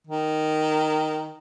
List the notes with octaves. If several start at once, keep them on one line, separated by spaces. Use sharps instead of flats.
D#3